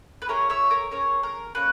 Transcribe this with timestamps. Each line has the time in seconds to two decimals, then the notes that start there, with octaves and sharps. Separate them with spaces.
0.22 B4
0.28 C#4 E4 G#4 A#4 C#5
0.50 C#5 E5
0.71 A#4 C#5
0.91 C#4 E4 A#4 C#5
0.96 G#4
1.23 A#4
1.55 A#3 C#4 F#4 B4